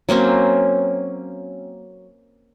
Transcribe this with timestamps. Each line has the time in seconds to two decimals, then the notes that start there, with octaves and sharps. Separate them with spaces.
0.09 F#3 A#3 C4 C#4